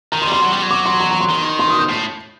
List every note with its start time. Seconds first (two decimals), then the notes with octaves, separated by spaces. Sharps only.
0.12 D#3 A#5
0.22 C6
0.27 G3
0.32 C6
0.42 F#3
0.52 G3
0.62 F#3
0.71 D6
0.86 C6
1.00 A#5
1.11 A#5
1.21 C6
1.30 D#3
1.59 C6
1.69 D#6
1.79 G6
1.89 A2